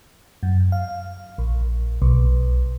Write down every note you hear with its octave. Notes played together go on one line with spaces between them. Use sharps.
F#2
F5
A#1
B1